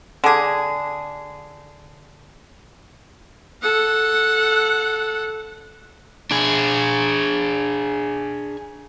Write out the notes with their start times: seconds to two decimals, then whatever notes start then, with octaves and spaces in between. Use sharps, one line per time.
0.24 D3 G#4
3.62 A4 F#5
6.31 D4 G#4